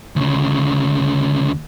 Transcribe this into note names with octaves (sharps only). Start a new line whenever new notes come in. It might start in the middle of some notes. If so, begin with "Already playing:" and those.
D2 C#3